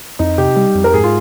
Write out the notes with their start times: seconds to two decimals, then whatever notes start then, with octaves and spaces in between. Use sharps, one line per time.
0.19 F2 D#4
0.38 C3 G4
0.56 G3
0.75 F2
0.84 A#4
0.93 G#2 G#4
1.04 F4